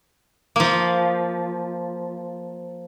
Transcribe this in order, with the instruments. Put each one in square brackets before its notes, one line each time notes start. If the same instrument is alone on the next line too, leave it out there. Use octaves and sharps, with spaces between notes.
[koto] F3 A#3